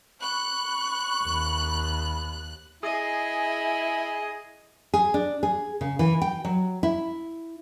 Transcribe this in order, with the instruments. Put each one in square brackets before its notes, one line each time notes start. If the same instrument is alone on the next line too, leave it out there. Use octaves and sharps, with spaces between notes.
[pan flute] B5 [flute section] C#6 [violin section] F#6
[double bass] D#2
[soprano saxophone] E4 [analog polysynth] G#4 [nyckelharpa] D#5
[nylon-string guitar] G#4
D4
G#4
C#3
E3
G5
F#3
E4